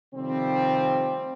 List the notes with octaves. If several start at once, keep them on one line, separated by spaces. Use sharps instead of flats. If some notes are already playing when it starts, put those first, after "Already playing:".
C3 D#3 F3 G3 A3 C4